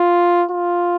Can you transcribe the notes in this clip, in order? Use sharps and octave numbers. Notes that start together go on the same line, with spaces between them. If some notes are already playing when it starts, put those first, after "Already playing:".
Already playing: F4
F4